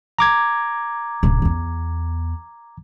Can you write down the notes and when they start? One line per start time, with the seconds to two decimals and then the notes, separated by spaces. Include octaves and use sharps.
0.19 A#5 D6 G#6
1.23 D1 C3
1.42 E2 B3